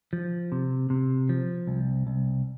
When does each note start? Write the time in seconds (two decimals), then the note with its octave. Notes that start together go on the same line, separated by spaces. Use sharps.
0.13 F3
0.52 C3
0.90 C3
1.29 F3
1.67 C2
2.07 C2